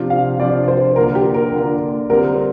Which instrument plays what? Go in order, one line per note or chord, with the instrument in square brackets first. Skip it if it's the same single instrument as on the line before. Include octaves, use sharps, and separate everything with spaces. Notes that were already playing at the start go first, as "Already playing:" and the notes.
Already playing: [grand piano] C3 F3 D4 F4
[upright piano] F5
[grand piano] C3 F3 D4 F4 [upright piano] D5
[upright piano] C5
[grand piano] D3 A#3 D4 F4 [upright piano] A#4
[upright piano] G4
A#4
[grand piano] D3 A#3 D4 F4
[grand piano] D3 G3 C4 [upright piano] A#4